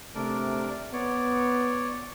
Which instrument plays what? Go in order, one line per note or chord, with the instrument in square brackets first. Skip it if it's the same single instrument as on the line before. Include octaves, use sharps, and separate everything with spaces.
[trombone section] C3 A3 [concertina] D4 A#4 D5
[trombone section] B3 [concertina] C#5 D5